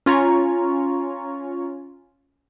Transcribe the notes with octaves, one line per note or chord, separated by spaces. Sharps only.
C#4 F4 C#5 A#5 C#6